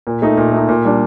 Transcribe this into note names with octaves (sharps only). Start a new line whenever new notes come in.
A#2
A3 D#4
A#2
A3 D#4
A#2
G3 D4